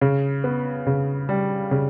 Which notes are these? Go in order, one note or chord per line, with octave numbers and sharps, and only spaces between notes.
C#3
B3
C#3
G3
C#3